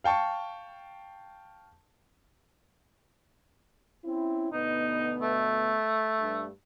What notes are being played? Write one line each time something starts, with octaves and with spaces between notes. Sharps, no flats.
F5 G5 A5 C#6
C4 C#4 E4
D2 B2 B3 D#4
A3
G2